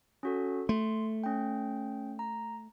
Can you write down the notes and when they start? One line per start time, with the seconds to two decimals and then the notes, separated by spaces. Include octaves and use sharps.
0.23 C#4 F#4 A4
0.69 A3 C6
1.24 C#4 G5
2.19 A#5